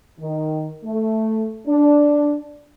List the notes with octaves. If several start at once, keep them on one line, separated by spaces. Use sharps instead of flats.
D#3
A3
D4